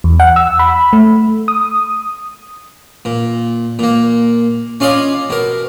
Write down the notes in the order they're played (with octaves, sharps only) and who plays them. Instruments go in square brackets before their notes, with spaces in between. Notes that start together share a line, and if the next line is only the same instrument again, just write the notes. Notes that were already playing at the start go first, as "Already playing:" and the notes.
[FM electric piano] E2
F#5
E6
B5
A3
D#6
[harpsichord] A#2
A#2 A#3
C#4 F4 D5 D#5 F5
B2 A#4